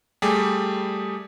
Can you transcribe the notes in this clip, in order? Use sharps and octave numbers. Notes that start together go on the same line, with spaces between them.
G3 A3 G4 G#4